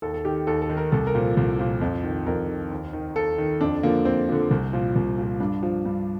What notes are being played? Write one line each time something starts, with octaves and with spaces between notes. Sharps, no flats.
D#2 A4
A4
D#3 G4
D#2 A4
A4
D#3
A#4
C2 A4
A#4
A#2 F3
C2
A#2 F3
F2
D#3
F2 A#4
D#3
D#2
D#3
D#2 A4
D#3
F2 D4
D3 F3 A#3
F2 C4
D3 F3
C2
A#2 F3
C2
A#2 F3
G2 D4
F3
G2